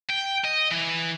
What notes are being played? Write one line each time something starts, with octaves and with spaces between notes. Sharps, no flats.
G5
D#5
E3